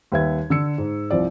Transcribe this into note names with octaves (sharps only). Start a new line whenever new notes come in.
D#2 G3 B4 E5 G#6
D3 E6 C#7
G#2
C2 F3 C4 D5